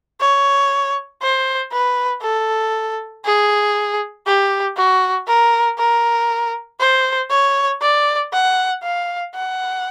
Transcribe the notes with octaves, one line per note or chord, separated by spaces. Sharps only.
C#5
C5
B4
A4
G#4
G4
F#4
A#4
A#4
C5
C#5
D5
F#5
F5
F#5